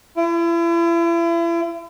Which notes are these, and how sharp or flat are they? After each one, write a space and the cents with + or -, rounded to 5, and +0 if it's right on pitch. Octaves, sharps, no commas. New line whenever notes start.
E4 +40